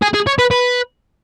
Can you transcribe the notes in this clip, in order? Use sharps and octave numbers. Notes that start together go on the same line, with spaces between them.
G#4
G#4
C#5
B4
B4